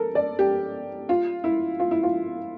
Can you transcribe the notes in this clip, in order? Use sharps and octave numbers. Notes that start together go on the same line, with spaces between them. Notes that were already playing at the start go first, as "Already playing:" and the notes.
Already playing: A4 A#4
D5
G4
F4
E4
F4
E4
F4